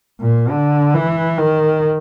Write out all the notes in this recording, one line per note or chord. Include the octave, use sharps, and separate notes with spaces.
A#2
D3
E3
D#3